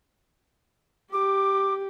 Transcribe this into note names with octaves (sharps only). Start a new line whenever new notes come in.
G4 D6